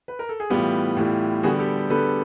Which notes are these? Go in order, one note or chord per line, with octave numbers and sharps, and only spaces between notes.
B4
A#4
A4
G#4
A2 E3 G3 B3 F4 G4
A2 E3 G3 B3
D3 G3 B3 F#4 G#4
G4 A4
D3 G3 B3 A4 B4